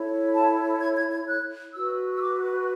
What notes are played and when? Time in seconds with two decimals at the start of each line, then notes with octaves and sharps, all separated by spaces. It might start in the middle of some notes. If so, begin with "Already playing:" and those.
Already playing: E4 A4 C#5
0.34 A5
0.81 G#6
0.96 G#6
1.11 G#6
1.28 F#6
1.75 F#4 B4 E6
2.16 E6
2.21 D6